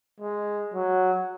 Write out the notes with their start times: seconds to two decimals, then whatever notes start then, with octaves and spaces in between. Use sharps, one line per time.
0.20 G#3
0.74 F#3